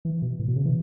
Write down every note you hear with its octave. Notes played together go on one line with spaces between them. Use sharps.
E3
B2
A2
B2
C#3
E3